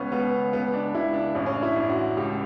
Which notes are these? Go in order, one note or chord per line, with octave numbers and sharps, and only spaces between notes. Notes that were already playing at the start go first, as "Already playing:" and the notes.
Already playing: C#2 B3 C#4
C#2 B3
C#2 B3
D4
C#2 E4
D4
A1 C#4
C#4
D4
E4
A1
F#4
C#2 G4